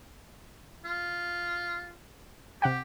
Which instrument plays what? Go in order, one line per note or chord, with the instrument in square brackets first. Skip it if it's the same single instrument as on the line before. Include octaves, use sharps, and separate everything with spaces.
[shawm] F4
[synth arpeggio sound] C3 F#5 G5 [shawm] G4